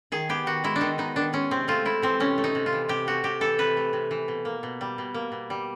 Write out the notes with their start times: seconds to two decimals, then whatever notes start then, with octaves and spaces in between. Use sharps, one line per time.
0.12 D#3 G#4
0.29 B3 G4
0.46 D#3 F#4
0.64 G#3 E4
0.76 D4
0.81 D#3 D#4
0.98 B3 D#4
1.16 D#3 D4
1.33 G#3 C#4
1.51 C3 C4
1.68 A3 F4
1.85 C3 E4
2.02 E3 C4
2.20 C3 C#4
2.38 A3
2.44 D#4
2.55 C3
2.66 F4
2.73 E3
2.89 C3 G4
3.07 A3 F#4
3.24 C3 G4
3.41 E3 A4
3.58 C3 B4
3.77 A3
3.93 C3
4.11 E3
4.28 B2
4.45 A#3
4.63 B2
4.81 G3
4.98 B2
5.14 A#3
5.32 B2
5.50 G3